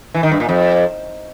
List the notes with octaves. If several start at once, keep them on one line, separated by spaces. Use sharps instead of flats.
E3
D#3
G2
A#2
F2